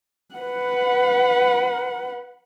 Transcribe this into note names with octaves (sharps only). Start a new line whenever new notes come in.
B4 F#5